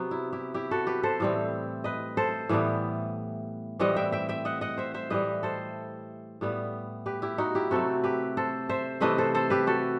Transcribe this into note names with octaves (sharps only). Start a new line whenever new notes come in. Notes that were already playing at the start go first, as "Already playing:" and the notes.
Already playing: C3 F#3 B3
E4
E4 G4
E4 G4
F#4 A4
G4 B4
A4 C5
A2 E3 G3 C4
B4 D#5
A4 C5
A2 E3 G3 B3
A2 E3 G3 C4 D#5 F#5
E5 G5
E5 G5
E5 G5
D#5 F#5
D#5 F#5
C5 E5
C5 E5
A2 E3 G3 B4 D#5
A4 C5
A2 G3 B3
G4 B4
E4 G4
D#4 F#4
E4 G4
C3 F#3 A3 C4 F#4 A4
G4 B4
A4 C5
C5 E5
C3 E3 A3 C4 B4 D#5
A4 C5
A4 C5
G4 B4
F#4 A4